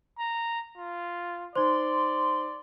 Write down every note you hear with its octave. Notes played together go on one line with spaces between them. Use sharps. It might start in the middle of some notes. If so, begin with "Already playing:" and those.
A#5
F4
D#4 C5 D5 C6